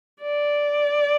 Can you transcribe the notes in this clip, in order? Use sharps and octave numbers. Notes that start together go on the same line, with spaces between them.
D5